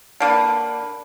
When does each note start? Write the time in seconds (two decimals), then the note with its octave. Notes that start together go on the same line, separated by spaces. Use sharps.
0.20 D3 A#3 B4